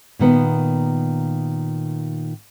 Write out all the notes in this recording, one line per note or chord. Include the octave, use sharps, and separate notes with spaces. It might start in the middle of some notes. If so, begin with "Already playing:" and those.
A#2 D#3 B3